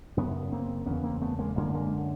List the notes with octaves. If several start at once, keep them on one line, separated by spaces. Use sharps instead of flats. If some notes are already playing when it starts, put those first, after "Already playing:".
F#2 C#3 B3 C#4
A#3 C4
E2 C#3 B3 C#4
A#3 C4
A3 B3
G#3 A#3
F#2 D3 G#3 A#3
G#3 A#3